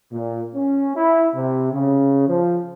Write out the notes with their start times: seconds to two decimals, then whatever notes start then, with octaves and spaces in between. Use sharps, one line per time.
0.12 A#2
0.55 C#4
0.96 E4
1.36 C3
1.73 C#3
2.28 F3